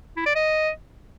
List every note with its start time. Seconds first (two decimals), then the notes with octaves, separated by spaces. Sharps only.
0.17 E4
0.26 D5
0.35 D#5